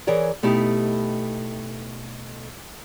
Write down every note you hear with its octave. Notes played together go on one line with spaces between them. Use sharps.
E3 G#4 A#4 C#5 D5
B2 A3 D#4 E4 G4